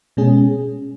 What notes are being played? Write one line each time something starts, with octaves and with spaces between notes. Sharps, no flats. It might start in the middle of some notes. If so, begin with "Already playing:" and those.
B2 G#3 C#4 G#4